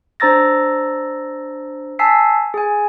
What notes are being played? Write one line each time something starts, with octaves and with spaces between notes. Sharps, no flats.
D4 C5 A#5 E6 A6 A#6
G#5 A5 E6 B6 C7
G#4 G#5